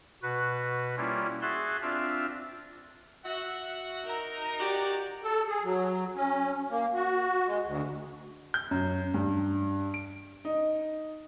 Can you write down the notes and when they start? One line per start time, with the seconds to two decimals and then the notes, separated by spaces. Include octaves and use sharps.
0.23 B2 F#4 B4
0.97 G3 A#3 C#4 E4 F4
1.42 F#4 G#4 E5 A5 C6 F#6
1.82 C4 D4 F4 E5 F5
3.26 F#4 E5 F#5
4.04 D#4 A#4 A#5
4.60 F#4 G4 D5
5.24 A4
5.48 G#4
5.64 F#3
6.16 C#4
6.70 A#3
6.95 F#4
7.47 G#3
7.65 D2
8.54 G6
8.71 F#2
9.14 G2
9.94 D7
10.45 D#4